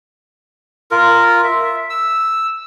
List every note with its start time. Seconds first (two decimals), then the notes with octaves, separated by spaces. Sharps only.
0.91 F4 A#4
1.44 E5
1.90 E6